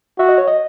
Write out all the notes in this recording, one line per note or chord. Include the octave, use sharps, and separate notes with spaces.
F#4 E5
D#5
C#5
D#5